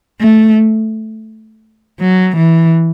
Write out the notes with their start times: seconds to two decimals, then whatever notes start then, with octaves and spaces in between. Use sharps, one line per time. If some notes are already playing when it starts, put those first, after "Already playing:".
0.20 A3
2.00 F#3
2.36 E3